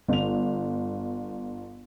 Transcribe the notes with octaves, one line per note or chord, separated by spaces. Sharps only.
G1 F7